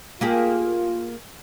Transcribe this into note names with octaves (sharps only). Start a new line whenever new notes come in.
A#3 F4 G4 G#4